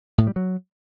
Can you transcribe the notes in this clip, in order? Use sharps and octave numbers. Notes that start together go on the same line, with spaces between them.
A2
G3
F#3